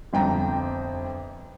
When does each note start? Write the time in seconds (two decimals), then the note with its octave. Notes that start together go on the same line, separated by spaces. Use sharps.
0.13 G1 F2 G5 A#5